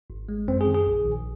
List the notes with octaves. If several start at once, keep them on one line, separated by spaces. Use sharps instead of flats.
G#1
G#3
F#2 C4
G#4
D#3
G#4
A#1
A#1